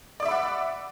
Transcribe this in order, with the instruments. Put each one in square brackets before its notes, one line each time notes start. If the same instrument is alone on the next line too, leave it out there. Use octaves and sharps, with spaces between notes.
[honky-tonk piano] D5
D6
E5
B5
F#5